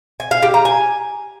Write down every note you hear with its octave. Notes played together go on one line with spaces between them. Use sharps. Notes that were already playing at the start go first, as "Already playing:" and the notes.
G#5
F5
G4
A#5
G#5